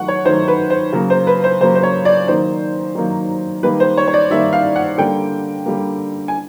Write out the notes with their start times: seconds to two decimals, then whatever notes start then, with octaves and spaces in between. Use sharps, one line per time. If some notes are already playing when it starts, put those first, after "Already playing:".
Already playing: D#3 F#3 A3 F#5 C#6
0.08 C#5
0.25 D#3 F#3 A3 C5
0.48 B4
0.70 C5
0.93 C#3 F#3 A#3
1.10 C5
1.27 B4
1.44 C5
1.61 C#3 F#3 A#3 C5
1.75 C5
1.83 C#5
2.05 D5
2.28 D#3 F#3 A#3 C5
2.95 D#3 F#3 A#3
3.63 D#3 G3 A#3 B4
3.80 C5
3.97 C#5
4.08 C#5
4.14 D5
4.30 D#3 G3 A#3 E5
4.53 F5
4.76 F#5
4.98 D3 G3 A#3 G5
5.66 D3 G3 A#3
6.28 G#5